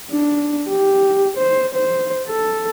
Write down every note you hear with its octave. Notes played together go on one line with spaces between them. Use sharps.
D4
G4
C5
C5
A4